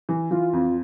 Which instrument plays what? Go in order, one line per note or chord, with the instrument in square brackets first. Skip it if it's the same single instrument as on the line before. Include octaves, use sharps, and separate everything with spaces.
[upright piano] E3
[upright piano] E3 [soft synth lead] F4
[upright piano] F2